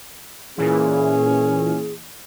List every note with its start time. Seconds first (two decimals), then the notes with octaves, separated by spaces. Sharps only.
0.58 A#2 E3 C#4 G#4